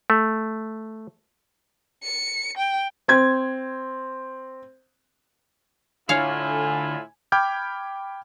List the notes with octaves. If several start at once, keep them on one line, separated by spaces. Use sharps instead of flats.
A3
C#7
G5
C4 G#6
A2 D3 E4 F4 C#5 F5 G#5
G5 B5 D6 F6 G6 G#6